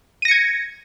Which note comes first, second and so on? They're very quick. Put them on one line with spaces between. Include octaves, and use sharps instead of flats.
D#7 A#6 C#7 G#6